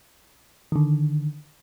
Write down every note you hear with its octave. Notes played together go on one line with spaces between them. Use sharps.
D3 D#3